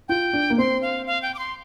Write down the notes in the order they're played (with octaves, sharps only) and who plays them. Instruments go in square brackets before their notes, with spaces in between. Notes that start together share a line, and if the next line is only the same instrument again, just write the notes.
[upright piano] F4 [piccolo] G5
[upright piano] D4
A#3
[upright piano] C4 [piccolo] C6
[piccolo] F5
F5
G5
D6
C6